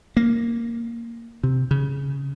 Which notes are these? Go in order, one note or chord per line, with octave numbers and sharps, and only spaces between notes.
A#3
C3
C#3